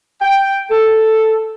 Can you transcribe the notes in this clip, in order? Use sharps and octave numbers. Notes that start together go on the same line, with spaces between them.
G5
A4